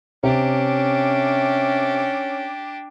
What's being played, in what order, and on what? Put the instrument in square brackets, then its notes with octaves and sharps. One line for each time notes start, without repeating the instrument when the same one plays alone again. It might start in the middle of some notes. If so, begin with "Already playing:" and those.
[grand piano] C3 [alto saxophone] C#4 [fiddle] D4 G4